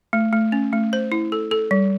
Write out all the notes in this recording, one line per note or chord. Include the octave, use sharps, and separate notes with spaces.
A3
A3
C#4
A3
C5
E4
A4
A4
G3